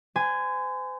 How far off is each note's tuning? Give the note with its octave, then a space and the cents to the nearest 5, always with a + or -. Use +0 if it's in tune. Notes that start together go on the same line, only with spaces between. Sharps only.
C5 -40 G#5 +0